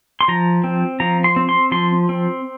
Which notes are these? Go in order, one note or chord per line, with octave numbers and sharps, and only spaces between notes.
C6
F3 A#5
C4
F3 A#5
C6
C4
C6
F3 C6
C4